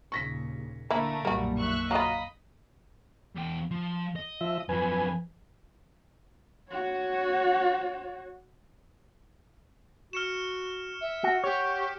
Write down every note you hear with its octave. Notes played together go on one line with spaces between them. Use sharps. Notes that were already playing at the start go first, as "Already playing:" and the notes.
D#2 A#2 C#3 C#6 A#6 B6
D3 A3 A#3 E4 A#4
B1 F#2 A#2 G3 A#3 F#4
E5 C#6 F#6
F#3 F4 D#5 F5 A#5 B5 D#6
E2 G5
F3
D#5
F3 E5
F#2 F3 B4 G#5
F#4 C#5
F#4 F6 C#7 E7
E5
F#4 F#5
G4 C#5